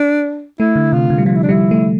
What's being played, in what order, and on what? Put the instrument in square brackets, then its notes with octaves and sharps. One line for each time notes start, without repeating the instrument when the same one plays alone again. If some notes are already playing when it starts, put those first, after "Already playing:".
Already playing: [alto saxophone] D4
[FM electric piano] A3 [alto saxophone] E4
[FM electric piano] D3
[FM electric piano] C3 [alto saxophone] F4
[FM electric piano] D3
G3
[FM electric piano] F3 [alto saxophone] F4
[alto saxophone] E4
D4
[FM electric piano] G3 [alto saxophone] E4
[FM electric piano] A3